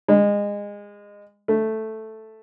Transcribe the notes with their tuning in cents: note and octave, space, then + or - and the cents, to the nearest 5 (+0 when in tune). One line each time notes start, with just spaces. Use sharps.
G#3 -25
A3 +0